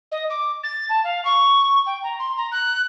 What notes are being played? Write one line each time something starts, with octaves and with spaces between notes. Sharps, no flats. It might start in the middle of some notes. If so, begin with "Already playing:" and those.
D#5
D6
A6
A5
F5
C#6
G5
A#5
C6
A#5
F#6